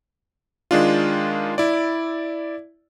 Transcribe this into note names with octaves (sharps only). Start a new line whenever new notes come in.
D#3 G#3 D4 F4
E4 D5